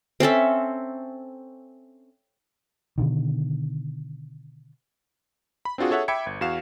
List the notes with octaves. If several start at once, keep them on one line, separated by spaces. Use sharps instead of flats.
C4 C#4 A4 E5
B2 D3 D#3
B5
C4 D4 F4 F#4 G#4
G#4 A4 C#5 E5 F#5
E5 G5 B5 D6 G#6 C#7
G1
E2 F#4 F5 E7